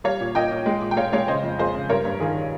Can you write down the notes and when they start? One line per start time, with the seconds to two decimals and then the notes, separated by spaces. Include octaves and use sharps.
0.04 G3 C#5 F5
0.20 A#2
0.35 A#2 D#5 G5
0.51 A#2
0.66 G#3
0.81 A#2
0.91 G5
0.97 G#3 C#5 F5
1.13 G#3 C#5 F5
1.28 C#3 C5 D#5
1.43 F2
1.59 F2 G#4 C5
1.75 C#3
1.89 G2 A#4 C#5
2.05 G2
2.20 D#3 F4 G#4